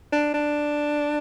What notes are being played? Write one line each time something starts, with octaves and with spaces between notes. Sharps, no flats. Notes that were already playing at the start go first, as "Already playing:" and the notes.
D4
D4